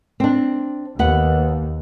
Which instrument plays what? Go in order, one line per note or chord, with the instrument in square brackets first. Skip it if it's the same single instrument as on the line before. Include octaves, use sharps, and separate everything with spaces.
[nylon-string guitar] C4 D4
[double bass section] D#2 [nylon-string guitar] B3 F#5